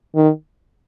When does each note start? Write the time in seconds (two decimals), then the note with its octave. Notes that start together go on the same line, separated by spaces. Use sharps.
0.16 D#3